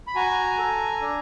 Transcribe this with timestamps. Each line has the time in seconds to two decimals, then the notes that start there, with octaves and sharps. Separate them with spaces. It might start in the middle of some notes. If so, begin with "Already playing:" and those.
0.07 B5
0.16 F#4 G#5 A#5
0.58 A4
1.01 D4